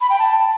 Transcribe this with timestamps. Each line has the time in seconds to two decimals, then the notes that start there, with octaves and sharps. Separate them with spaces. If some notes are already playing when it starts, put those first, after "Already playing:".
0.01 B5
0.10 G5
0.19 A5